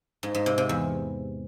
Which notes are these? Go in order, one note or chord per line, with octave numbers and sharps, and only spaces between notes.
G#2
G#2
C3
C3
E2